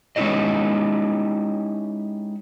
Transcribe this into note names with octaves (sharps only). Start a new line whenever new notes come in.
G#3 C#4 D#4 E4 G4 D#5